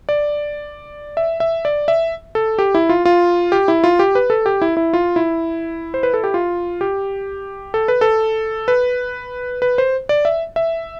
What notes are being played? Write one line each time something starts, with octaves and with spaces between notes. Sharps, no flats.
D5
E5
E5
D5
E5
A4
G4
E4
F4
F4
G4
E4
F4
G4
B4
A4
G4
E4
E4
F4
E4
C5
B4
A4
G4
F4
G4
A4
B4
A4
B4
B4
C5
D5
E5
E5